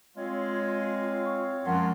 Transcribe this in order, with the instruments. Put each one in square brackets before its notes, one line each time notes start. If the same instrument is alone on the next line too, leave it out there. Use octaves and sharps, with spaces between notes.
[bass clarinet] G#3 [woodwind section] C4 C#5 F5 [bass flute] F4
[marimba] C#6
[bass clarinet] F#2 [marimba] F3 G#3 [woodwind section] A#4 A5 C6 [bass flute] F#5